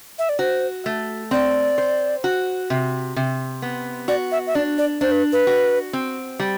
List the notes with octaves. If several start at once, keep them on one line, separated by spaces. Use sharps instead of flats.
E5
D5
F#4 C5
A3
C4 D5
C5
F#4
C3
C3
B3
F#4 D5
E5
E5
D4 D5
D5
D4 C5
B4
B4
F#4
C4
G3